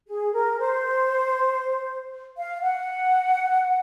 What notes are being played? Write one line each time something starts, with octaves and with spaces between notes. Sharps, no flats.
G#4
A#4
C5
F5
F#5